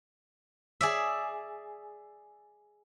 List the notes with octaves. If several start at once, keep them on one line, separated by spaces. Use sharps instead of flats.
G#4 D5 E5